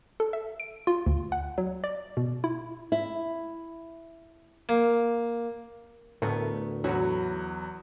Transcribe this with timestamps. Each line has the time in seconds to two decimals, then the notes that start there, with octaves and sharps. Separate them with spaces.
0.20 A4
0.33 E5
0.60 D7
0.87 F4
1.06 D2
1.32 F#5
1.58 F#3
1.84 D5
2.17 B2
2.44 E4
2.92 E4
4.69 A#3
6.22 D2 A2 A3 B3 A#4
6.84 E2 F#3 E4 F#4 C#5